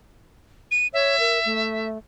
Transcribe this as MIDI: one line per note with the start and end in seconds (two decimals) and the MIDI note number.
0.71 0.87 99
0.93 1.16 73
0.93 1.88 76
1.20 1.39 70
1.45 1.98 57